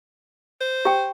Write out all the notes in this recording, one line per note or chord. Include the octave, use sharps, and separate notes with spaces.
C5
G4 G5